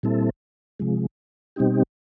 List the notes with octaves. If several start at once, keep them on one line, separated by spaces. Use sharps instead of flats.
A#2 G3 C4 E4 A4
C3 F3 G#3
B2 G3 C4 D#4 G4